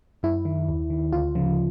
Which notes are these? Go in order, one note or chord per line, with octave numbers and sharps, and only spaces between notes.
F#2 E4
D#3
D#2
D#3
D2 F4
C#3 F3